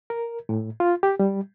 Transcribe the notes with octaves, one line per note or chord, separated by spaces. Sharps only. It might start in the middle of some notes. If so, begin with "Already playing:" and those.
A#4
A2
F4
G4
G3